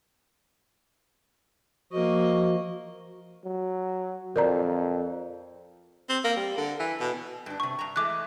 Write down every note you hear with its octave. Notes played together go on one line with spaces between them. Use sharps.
F3 A#3 F#4 D#5
F#3
F2 A#4 D5 A#5
C4
A#3
G3
D3
E3
B2
G2 D4
G#2 C3 C#6
G2 A#5
E3 G#3 A3 D6 F#6